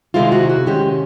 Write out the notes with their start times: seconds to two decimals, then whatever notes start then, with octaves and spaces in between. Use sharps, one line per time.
0.14 C3 D#3 G#3 C4 E4 F4
0.32 F#4
0.49 F#4
0.66 C3 D#3 G#3 C#4 G4